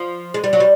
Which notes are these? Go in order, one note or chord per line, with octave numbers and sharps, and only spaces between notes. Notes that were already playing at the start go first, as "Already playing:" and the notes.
Already playing: F3
G#3
G3
F#3
G3